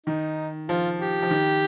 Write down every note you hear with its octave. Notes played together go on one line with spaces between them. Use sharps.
D#3 D#4
F3 F4
G4
F3
D#3